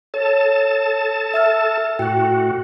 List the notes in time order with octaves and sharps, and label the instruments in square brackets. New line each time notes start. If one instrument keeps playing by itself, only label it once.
[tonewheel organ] A4 A5 [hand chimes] C#5
[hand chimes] E5 E6 F6
[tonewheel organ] A2 F#4 [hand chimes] G5 F#6